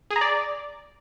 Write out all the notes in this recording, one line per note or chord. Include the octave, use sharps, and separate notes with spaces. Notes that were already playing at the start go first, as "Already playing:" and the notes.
G#4
A#5
D5